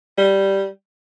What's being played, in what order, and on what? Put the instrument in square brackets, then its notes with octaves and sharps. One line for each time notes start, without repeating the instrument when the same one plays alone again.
[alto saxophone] G3